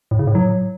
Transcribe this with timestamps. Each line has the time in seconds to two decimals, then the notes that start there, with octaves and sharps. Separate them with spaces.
0.11 A2
0.19 C#3
0.27 A2
0.35 F#3